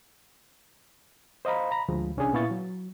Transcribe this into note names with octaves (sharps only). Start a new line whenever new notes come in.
C5 D#5 F5 A#5 B5
A#5 B5
D2 F3 G#3
C2 C#4 D4 G#4 G#5
A#2 B3 E4 F5 C#6 A6
F#3